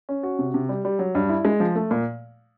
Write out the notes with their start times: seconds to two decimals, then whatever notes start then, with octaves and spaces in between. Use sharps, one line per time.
0.09 C#4
0.23 F#4
0.39 C3
0.54 C3
0.69 G3
0.85 G3
0.99 F#3
1.15 G2
1.29 E4
1.45 G#3
1.60 F3
1.75 A3
1.91 A#2